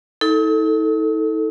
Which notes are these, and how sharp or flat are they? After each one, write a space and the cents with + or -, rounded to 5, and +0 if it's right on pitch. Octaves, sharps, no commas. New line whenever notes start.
D#4 +45 A4 +0